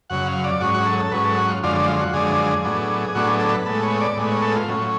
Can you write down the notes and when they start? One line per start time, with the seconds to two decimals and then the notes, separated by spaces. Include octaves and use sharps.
0.10 F#2 C#3 F#3 F#5
0.27 F5
0.44 D5
0.60 G#2 F#3 C#4 F#4
0.74 F#4
0.86 A4
0.99 A4
1.12 G#2 F#3 C#4 B4
1.24 A4
1.37 F#4
1.50 F4
1.63 F#2 D3 F3 G#3 D4 F4
1.75 D4
1.88 F4
2.01 F#4
2.13 F#2 D3 F3 G#3 D4 G#4
2.64 A2 F#3 B3 D4
3.15 A2 F#3 B3 D4 F#4
3.27 G#4
3.40 A4
3.54 B4
3.66 A2 G#3 B3 A4
3.83 C#5
4.01 D5
4.17 A2 G#3 B3
4.31 C#5
4.42 A4
4.56 F4
4.68 A2 F#3 C#4